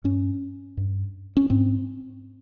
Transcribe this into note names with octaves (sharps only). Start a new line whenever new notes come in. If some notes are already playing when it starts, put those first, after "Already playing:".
G2 C#4
G2
C#4
G#2 C4